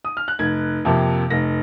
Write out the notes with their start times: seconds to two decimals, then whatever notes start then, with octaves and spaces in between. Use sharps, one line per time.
0.05 D#6
0.17 F6
0.28 F#6
0.39 F1 G#6
0.85 F2 C3 F3 A#3
1.30 F1 A#6